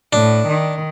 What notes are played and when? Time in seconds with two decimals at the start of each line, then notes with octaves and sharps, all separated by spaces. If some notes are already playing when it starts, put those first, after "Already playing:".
0.13 A2 D4
0.48 D#3